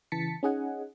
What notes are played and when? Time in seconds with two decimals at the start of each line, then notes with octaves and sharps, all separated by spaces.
0.12 C#3 E3 A5 A6 B6 C#7
0.43 C#4 D#4 G#4 D#5 F#5 G#5